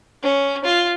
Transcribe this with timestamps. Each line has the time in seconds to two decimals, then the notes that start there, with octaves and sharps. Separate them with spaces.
0.23 C#4
0.64 F4